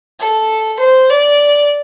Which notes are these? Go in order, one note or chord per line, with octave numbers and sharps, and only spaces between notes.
A4
C5
D5